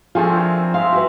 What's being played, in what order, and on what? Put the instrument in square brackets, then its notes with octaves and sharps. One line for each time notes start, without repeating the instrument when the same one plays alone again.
[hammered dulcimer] E3 A3 C4 [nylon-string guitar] F3 D4 [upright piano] F4 G#4 A4
[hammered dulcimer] C4 A#4
[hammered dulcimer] G#3 E5 [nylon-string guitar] F5
[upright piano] E4 [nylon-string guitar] F#4 B4